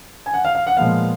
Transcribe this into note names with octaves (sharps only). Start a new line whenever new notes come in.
G#5
F#5
F5
F5
F#5
A#2 F3 G#3 B3 F5